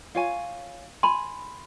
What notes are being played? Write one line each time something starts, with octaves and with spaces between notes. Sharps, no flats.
F4 C#5 G#5
G#5 B5 C6